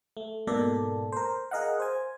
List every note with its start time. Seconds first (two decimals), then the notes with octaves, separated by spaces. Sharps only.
0.17 A3
0.47 G#2 B2 A#3 A4 D5
1.12 A#4 C5
1.51 G#4 A#4 D#5 F5 F#5
1.80 C5 G#5